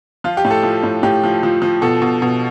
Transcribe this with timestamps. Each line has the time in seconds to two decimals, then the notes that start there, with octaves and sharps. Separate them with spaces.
0.24 F3 F4
0.37 G4
0.45 A2
0.51 A4
0.63 F3
0.83 A2
1.03 A2 G4
1.24 F3
1.43 F3
1.62 F3
1.82 B2 A4
2.02 B2
2.22 B2